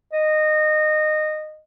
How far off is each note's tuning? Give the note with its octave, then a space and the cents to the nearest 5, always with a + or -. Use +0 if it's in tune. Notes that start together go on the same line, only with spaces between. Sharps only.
D#5 -20